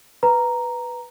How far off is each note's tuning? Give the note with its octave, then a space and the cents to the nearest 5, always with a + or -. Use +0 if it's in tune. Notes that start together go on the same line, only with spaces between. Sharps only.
B4 +0 A#5 +0